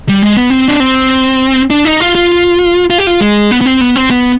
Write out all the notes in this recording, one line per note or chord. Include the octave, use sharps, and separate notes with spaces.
G3
G#3
B3
C4
D4
C4
D4
D#4
F4
F4
F4
G4
F4
G#3
B3
B3
C4
B3
C4
B3